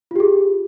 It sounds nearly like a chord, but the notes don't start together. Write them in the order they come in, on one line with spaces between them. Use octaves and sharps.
F4 G4 G#4